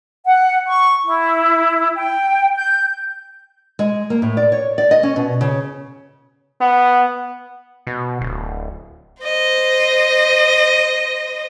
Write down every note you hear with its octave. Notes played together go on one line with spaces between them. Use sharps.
F#5
C#6
E4
G5
G6
G#3
A#3
A2
D5
C#5
D5
D#5
C#4
B2
C#3
B3
B2
D1
C5 D#5